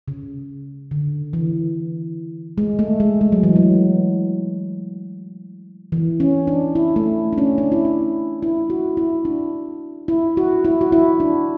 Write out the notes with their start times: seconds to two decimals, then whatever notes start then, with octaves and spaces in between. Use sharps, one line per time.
0.08 C#3
0.91 D3
1.33 E3
2.58 G#3
2.79 A3
3.00 G#3
3.21 G#3
3.32 F#3
3.43 E3
3.56 F#3
5.92 E3
6.20 C#4
6.47 D4
6.75 E4
6.96 A3
7.33 D4
7.38 C#4
7.58 D4
7.72 E4
7.85 D4
8.43 E4
8.70 F#4
8.97 E4
9.25 D4
10.08 E4
10.37 F#4
10.65 E4
10.81 F#4
10.92 E4
11.20 D4